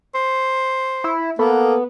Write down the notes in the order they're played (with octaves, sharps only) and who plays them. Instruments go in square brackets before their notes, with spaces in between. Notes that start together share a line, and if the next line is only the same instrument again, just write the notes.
[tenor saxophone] C5
[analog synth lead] E4
[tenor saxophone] A#3 [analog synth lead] B3 [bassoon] A4